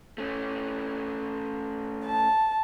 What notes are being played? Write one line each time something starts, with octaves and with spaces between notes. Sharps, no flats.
A3 C#4
A5